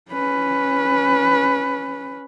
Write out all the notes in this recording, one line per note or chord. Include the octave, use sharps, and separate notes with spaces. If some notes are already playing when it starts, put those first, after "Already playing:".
C#4 B4